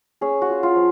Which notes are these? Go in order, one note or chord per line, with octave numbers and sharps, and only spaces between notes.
C#4 G#4
F#4
F4
F4
F3